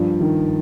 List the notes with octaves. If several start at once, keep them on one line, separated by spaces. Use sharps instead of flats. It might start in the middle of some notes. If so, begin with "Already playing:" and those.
Already playing: G2 F3
D#3